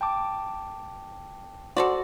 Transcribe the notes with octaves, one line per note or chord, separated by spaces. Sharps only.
G5 A5 D6
F#4 A4 C5 D5